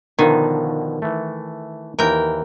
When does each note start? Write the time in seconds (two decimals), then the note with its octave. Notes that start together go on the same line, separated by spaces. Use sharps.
0.19 B2 D3 D#3 F3
1.02 E3 A3
1.99 D#2 E3 A#4 G5